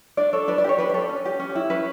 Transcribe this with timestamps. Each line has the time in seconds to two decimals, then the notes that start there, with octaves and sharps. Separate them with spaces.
0.17 D4 D5
0.33 A4 C#5
0.48 D4 B4
0.58 D5
0.64 G4 C#5
0.78 D4 B4
0.90 D5
0.94 A4 C#5
1.09 C#4
1.25 G4
1.40 C#4
1.55 E4
1.70 C#4 B4